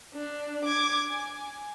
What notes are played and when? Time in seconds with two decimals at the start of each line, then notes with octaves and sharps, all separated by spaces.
0.14 D4
0.65 D6 G#6
1.11 G#5